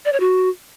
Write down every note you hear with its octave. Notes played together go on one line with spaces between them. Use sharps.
D5
C#5
F#4